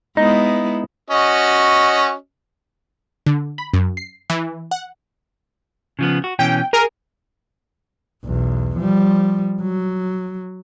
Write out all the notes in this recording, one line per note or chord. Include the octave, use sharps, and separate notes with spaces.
G#3 B3 D#4 E4
C#4 F#4 D#5
D3
B5
F#2
C7
E3
F#5
C#3 F3 B3
F#4
B2 E3 C#4 G5
G#4 A#4
B1 E2
F3 G3
F#3